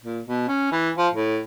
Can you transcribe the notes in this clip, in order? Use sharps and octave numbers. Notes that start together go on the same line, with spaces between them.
A#2
B2
C#4
E3
F3
A2